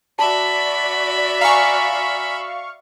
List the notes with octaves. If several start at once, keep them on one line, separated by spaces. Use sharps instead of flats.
F#4 D5 E5 A5 B5
F5 G#5 A#5 C#6